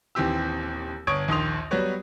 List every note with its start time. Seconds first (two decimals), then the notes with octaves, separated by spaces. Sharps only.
0.15 D#1 D#2 E3 C4 G4 E6
1.07 G1 C#5 C#6 D#6 G#6 D7
1.28 A#1 D#2 D#3 C6 D#6 F7
1.71 F#3 G3 B3 F#4 B4 C#5